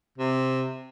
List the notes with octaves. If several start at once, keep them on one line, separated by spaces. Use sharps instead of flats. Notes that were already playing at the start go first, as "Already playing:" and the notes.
C3